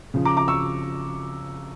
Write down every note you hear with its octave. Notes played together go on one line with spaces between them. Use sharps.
C#3 F3
A#5 D6
A#5 D6
C#6 E6